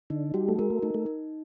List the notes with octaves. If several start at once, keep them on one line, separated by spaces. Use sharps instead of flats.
D3 D#4
G3 F#4
A3
G#3 A#4
A3
A3 D#4
A3
D#4